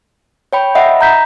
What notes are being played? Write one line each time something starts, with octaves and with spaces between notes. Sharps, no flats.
C#5 G5 B5
D#5 E5 F#5 B5
A#5 G6 B6